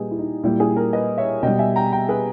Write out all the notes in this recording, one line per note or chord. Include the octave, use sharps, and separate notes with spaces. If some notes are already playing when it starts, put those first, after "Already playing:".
Already playing: A#2 G3 G#4 B4 D#5
E4
D#4
A#2 G3 E4
E4 G#4
G4 A#4
B4 D#5
C#5 E5
B2 G3 D#5 G5
E5 G#5
G5 A#5
G5 A#5
G#4 B4